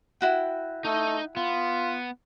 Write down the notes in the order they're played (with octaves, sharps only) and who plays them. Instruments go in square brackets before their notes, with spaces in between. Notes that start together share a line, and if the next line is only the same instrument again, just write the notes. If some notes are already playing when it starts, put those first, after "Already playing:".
[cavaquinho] E4 F#4 G5
[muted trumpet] A3 [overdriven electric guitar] D#4 D#5
[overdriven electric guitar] B3 [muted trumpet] F4